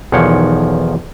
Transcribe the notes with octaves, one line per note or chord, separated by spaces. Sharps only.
B1 E2 D#3 F3 C#5 F#5